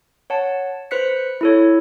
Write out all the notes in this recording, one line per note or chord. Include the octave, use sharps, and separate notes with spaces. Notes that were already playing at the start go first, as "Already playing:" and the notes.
C#5 F#5 A5
B4 C5 F#6 B6 C#7
E4 A4 C#5